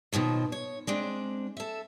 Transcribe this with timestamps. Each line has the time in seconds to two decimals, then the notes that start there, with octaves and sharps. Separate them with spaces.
0.13 B2 D#3 F3 F#3
0.52 C#5
0.87 G#3 C4 D4
1.57 A4 E5